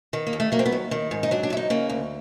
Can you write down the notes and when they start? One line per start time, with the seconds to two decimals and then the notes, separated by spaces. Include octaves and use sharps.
0.13 D#3 B3
0.27 A#3
0.33 D#2
0.40 A3
0.52 F#3 A#3
0.59 C4
0.66 B3
0.72 D#2
0.91 D#3
1.11 G#2
1.23 D#4
1.31 F#3 D4
1.43 D4
1.50 G#2 E4
1.57 D#4
1.70 C#3 A#3
1.89 D2